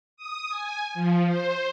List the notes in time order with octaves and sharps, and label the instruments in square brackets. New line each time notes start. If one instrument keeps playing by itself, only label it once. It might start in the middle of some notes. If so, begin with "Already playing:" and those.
[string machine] D#6
G#5
F3
C5